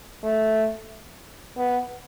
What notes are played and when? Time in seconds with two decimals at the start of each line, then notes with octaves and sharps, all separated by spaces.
0.23 A3
1.57 B3